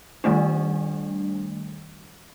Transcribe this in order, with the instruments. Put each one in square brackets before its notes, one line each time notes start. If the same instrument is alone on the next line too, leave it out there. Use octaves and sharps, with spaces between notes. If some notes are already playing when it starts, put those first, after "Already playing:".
[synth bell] D#3 G3 A3 D4